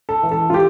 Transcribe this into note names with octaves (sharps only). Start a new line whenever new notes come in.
A4
E3
A4
F4
G4